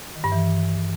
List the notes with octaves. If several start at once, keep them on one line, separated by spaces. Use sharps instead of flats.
D#3
G2
E3